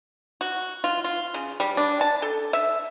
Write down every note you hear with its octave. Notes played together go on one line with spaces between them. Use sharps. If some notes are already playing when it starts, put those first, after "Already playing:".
F#4
F4
F4
C#3
G3
D4
A5
A4
E5